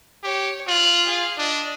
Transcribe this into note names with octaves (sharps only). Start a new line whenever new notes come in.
G4 C#5
F4 F#6
G#4 F5
D4 D#5